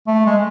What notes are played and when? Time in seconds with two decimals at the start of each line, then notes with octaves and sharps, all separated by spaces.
0.07 A3
0.26 G#3